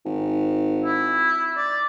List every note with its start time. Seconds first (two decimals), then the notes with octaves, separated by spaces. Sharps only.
0.05 G#1
0.84 E4
1.57 D5